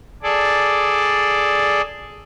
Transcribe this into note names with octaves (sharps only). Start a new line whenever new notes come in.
G#4 A4 D5